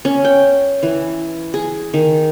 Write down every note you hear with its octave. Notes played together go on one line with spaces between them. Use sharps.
C#4
G5
E3
G#4
D#3